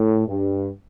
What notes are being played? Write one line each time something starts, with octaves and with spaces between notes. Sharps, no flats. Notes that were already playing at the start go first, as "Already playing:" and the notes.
Already playing: A2
G2